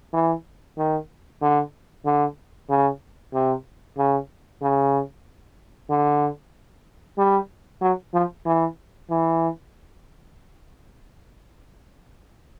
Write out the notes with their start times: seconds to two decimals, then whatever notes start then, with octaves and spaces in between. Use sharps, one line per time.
0.13 E3
0.77 D#3
1.41 D3
2.05 D3
2.69 C#3
3.34 C3
3.97 C#3
4.62 C#3
5.90 D3
7.18 G3
7.82 F#3
8.14 F3
8.46 E3
9.10 E3